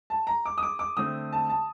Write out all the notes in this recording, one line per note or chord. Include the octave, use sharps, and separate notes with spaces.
A5
A#5
D6
D#6
D6
D6
D3 A3 C4 D#6
A5
A5